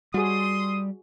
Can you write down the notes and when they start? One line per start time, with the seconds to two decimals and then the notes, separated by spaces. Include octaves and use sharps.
0.14 G3 F#4 G#4 C6 D#6